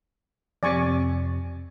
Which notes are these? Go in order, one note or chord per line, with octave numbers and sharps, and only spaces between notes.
F2 C3 D5 G#5 C#6